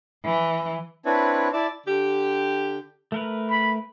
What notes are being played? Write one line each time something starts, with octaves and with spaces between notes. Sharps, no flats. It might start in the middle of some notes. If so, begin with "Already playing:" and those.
E3
C4 D4 E4 B4 C#5
E4 D5 A5
D3 G4
A3 A#4 B4
B5